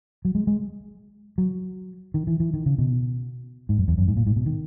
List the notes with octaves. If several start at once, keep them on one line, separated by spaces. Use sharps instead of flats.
F#3
G#3
G#3
F#3
D#3
E3
E3
D#3
C#3
B2
G#2
F#2
E2
F#2
G#2
A#2
G#2
B2
D#3